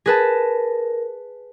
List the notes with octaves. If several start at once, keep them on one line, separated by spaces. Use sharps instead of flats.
G#4 A#4 B4 A5